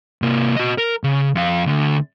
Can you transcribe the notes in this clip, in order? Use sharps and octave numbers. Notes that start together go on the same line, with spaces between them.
C3 A#3
F#4 D#5
A#4
C#3
F2 F5
D2 D3